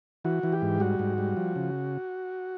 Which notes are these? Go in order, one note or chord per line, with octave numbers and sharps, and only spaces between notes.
E3 F#4
E3
G4
G#2
G3 F#4
G#2
G3
F3
C#3